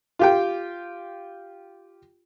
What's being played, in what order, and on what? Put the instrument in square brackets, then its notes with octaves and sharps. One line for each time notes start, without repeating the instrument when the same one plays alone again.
[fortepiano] F4 G4 G5